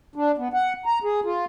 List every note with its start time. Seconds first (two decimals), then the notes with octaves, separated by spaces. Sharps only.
0.16 D4
0.38 B3
0.54 F#5
0.86 A#5
1.04 G#4
1.25 F4